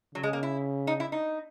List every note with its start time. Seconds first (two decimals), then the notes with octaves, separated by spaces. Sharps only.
0.15 C#3 F#3
0.23 G#3
0.33 A#3
0.43 E4
0.87 D#4
1.00 E4
1.12 D#4